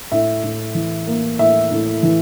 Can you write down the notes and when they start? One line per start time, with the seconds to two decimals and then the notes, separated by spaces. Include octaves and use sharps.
0.12 A2 E5
0.43 A2
0.75 E3
1.07 A#3
1.39 A2 E5
1.71 A2
2.03 E3